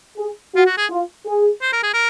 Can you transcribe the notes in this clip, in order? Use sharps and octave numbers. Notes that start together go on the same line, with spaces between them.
G#4
F4 F#4
F#4
G#4
F4
G#4
C5
A#4
G#4
A#4